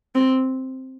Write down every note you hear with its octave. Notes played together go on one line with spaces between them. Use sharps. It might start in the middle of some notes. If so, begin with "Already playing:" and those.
C4